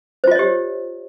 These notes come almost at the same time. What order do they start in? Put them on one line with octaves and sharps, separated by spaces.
C5 F4 D#5 C#5 G4